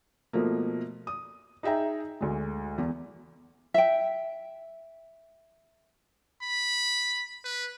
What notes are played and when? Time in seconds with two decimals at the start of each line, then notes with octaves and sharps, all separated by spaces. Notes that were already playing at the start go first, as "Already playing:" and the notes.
0.33 B2 F3 A3 A#3
1.07 D#6
1.63 D#4 G#4 E5 G5 A#5
2.21 D2 G#3
2.78 E2
3.74 E5 G5
6.42 B5
7.44 B4